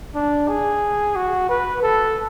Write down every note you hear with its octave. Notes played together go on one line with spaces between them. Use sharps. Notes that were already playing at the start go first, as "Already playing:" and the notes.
D4
G#4
F#4
B4
A4